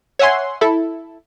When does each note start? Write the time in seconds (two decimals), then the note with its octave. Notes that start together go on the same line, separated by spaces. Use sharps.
0.19 C#5 E5 F#5 G#5 C6
0.61 E4 A4